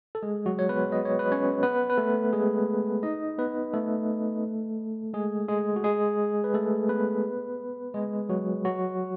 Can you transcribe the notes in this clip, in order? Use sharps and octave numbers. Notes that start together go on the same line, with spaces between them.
A4
G#3 G#4
F#3 F#4
C#5
B3 B4
D#5
C#5
B4
C#4 C#5
B3 B4
B4
A3 A4
G#3 G#4
D#4 D#5
B3 B4
A3 A4
G#3 G#4
G#3 G#4
F#4
G#3 G#4
B4
A3 A4
B3 B4
G#3 G#4
F#3 F#4
F#3 F#4